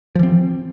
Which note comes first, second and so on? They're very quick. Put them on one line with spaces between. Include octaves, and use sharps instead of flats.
F3 E3 C4